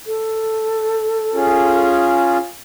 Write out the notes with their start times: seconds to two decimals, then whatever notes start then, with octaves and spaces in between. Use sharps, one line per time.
0.07 A4
1.34 C#4 F4 G#4